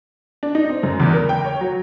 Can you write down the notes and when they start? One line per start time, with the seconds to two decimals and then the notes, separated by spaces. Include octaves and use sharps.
0.43 D4
0.55 D#4
0.69 C4
0.83 F#2
1.00 E2
1.13 A#4
1.29 G5
1.45 C#5
1.61 F#3